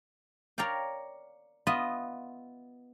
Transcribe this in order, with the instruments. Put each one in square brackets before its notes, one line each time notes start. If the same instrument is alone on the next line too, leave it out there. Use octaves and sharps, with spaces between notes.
[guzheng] A#4 C#5 D5 F5 G5
B3 F4 D#5 E5